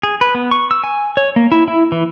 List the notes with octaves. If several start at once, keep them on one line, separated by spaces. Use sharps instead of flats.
G#4
B4
B3
C#6
E6
G#5
C#5
A#3
E4
E4
E3